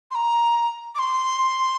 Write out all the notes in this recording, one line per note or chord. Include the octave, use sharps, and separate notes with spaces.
C6
A#5
D6
C6